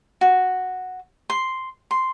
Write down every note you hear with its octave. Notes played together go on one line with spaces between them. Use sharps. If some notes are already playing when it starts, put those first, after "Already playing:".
F#4
C6
C6